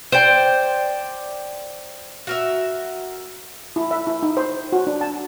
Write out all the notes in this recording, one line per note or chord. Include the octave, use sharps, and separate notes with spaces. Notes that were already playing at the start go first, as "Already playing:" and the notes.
C5 D5 G5
F#4 A#4 E5
E4
E5
E4
D#4
C5
F#4
D4
A5